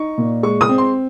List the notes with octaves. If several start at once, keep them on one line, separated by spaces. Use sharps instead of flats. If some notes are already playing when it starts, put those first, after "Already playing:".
Already playing: D#4 C#6
A#2
G#3 C#6
D#6
C4
C6